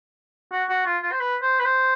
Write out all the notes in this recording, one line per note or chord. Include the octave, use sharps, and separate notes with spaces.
F#4
F#4
F4
F4
C5
B4
C5
B4
C5